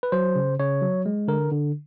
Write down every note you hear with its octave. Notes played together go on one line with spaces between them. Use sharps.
B4
F#3 C5
C#3
C#3 C#5
F#3
G#3
D3 A#4
D3